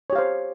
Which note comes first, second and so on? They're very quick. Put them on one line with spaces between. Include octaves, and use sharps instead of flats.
C#5 G4 F5 C5